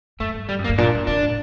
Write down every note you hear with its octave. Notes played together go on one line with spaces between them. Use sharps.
F#2 A3
G2
G2 G3
F#2
A#3
G2
A#2 D4
C3 D4
A2